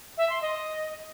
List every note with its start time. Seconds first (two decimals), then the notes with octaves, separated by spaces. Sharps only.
0.18 E5
0.30 C6
0.42 D#5